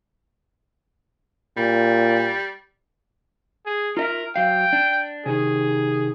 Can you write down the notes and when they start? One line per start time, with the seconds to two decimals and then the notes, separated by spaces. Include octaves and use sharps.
1.57 A#2 G3
3.66 G#4
3.97 F4 A#4 D#5 E5
4.36 F#3 F5 G5
4.73 D4
5.26 C3 D#3 G#4